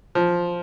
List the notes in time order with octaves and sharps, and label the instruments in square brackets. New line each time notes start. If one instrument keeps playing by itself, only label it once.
[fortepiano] F3